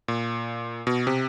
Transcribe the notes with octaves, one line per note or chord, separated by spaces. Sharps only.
A#2
B2
C3